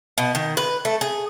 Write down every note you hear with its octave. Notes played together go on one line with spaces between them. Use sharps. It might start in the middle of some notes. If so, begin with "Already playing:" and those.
B2
D#3
B4
A3
G#4